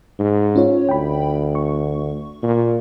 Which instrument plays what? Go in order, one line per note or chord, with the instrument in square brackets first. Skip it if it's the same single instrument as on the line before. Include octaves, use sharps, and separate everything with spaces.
[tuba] G#2
[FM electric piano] C#4 F4 C#5
[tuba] D2 [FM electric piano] G5 B5
[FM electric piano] C#6
[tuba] A#2